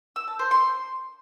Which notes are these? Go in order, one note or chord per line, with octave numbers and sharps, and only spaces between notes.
E6
A5
C5
C6